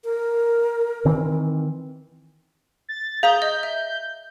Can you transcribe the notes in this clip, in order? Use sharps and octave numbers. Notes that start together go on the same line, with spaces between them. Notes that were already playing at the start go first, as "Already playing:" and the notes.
A#4
D#3 E3 C4
A6
G#4 F5 A#5 D#6 G6
D#5
E5